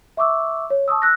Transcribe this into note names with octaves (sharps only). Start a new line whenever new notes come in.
E5 C#6 D6 E6
C#5
A5 C#6 D#6 E6
E6 F#6 A#6